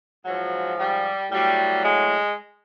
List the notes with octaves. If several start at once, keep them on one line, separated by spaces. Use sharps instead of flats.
G#2 F3 F#3
G3
A2 F#3 G3
G#3